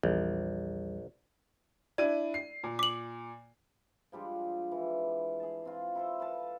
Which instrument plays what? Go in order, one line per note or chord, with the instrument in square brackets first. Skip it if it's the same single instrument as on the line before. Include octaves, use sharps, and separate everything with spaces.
[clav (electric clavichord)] A#1 [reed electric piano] E2 G3
[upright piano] D4 E4 D#7 [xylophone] D5
[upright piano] C7
A#2
[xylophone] D6 F#7
[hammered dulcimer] F3 G3 G#3 D4
E3
G#4 A5
C4 F4
E4 A4 C5
B4 F5 A5